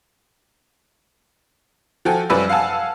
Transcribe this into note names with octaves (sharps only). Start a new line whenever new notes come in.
F3 F#4 A4 G5 G#5
F#2 F3 G3 B4 D5 E6
F5 F#5 G#5 A5 E6